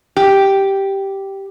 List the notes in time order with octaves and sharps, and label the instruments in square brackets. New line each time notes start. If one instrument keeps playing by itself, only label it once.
[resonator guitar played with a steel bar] G4